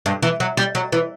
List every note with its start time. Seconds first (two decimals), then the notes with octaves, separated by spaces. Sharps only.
0.06 G2
0.22 E3
0.40 F#3
0.57 G3
0.75 F#3
0.92 E3